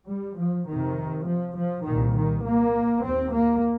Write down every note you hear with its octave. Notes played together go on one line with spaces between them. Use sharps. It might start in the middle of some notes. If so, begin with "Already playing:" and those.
G3
F3
F2 C3 D#3
F3
F3
C2 A#2 D#3
D#3
A#3
D#2 C4
A#3